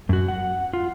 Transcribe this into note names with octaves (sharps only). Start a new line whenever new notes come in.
F#2 F#4
F#5
F4